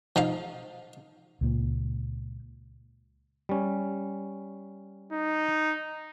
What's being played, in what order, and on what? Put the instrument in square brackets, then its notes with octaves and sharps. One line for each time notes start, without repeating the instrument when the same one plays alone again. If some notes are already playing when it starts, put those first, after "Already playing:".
[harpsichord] F3 D#4 F5
[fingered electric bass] C#2 A#2
[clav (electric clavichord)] G3 C#4
[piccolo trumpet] D#4